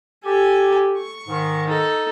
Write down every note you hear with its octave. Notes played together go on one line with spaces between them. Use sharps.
G4 A4 G#5
C#6
G#2 D#3
D#4 A4